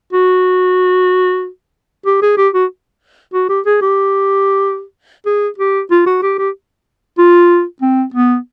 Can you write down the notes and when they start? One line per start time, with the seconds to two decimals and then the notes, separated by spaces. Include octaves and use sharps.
0.13 F#4
2.06 G4
2.22 G#4
2.38 G4
2.54 F#4
3.34 F#4
3.49 G4
3.66 G#4
3.82 G4
5.26 G#4
5.58 G4
5.91 F4
6.07 F#4
6.23 G4
6.39 G4
7.18 F4
7.82 C4
8.14 B3